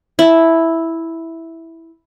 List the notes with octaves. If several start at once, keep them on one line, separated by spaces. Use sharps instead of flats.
E4 A5